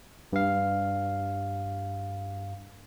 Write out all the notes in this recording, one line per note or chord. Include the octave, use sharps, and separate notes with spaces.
G2 F5